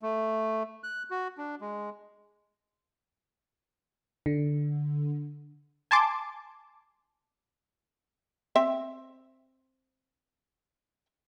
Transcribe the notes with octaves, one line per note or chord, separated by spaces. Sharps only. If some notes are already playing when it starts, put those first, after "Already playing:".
A3
F#6
F#4
D4
G#3
D3
G#5 A5 C6 D6
C4 E5 G5